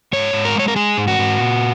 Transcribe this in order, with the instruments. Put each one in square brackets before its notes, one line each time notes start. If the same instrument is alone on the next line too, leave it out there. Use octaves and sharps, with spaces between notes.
[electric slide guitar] G#2 C#5
G#2
A#4
G#3 C#5
A#4
G#3 G#4
G#2
F#4
G#2
A#2